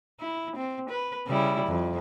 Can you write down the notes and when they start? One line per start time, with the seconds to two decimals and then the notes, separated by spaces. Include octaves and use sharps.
0.20 E4
0.56 C4
0.90 B4
1.27 C#3 G3 E4
1.67 F2